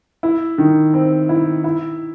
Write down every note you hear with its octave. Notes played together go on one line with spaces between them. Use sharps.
E4
D#3
C4
E4
E4